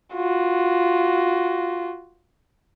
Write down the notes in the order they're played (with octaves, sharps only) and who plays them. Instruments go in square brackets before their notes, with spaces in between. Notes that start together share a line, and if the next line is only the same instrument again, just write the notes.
[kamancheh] F4 F#4